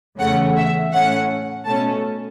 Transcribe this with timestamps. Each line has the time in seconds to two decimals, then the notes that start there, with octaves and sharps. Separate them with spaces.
0.20 E2 C#3 A3 C#4 F#5
0.56 E5
0.93 A2 A3 C#4 F#5
1.66 B2 A3 C#4 A5